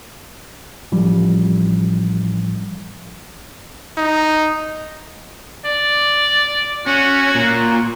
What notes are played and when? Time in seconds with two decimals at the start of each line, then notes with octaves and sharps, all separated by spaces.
0.92 A1 F3 G3
3.98 D#4
5.65 D5
6.86 C#4 F#4
7.35 A#2